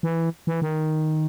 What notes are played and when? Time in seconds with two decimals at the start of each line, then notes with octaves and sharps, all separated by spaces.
0.03 E3
0.47 E3
0.62 D#3